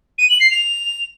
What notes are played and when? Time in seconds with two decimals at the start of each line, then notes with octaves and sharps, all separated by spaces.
0.18 D#7
0.29 F#7
0.40 C7
0.51 F7